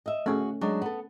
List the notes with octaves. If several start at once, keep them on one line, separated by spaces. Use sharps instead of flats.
D#5 E5
A3 C#4 F#4 G#4
F#3 G#3 D4
B3 A4